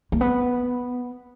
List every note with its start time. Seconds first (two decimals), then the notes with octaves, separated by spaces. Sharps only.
0.12 A#3
0.21 B3